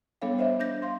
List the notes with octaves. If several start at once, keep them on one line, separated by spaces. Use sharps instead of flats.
G3 B3 D4 A4 C#5 F5
C5 D#5 E5
D4 G6 A#6
F5 C6